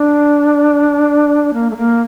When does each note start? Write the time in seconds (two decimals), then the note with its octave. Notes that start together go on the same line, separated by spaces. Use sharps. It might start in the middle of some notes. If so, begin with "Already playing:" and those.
Already playing: D4
1.53 A#3
1.71 A3
1.77 A#3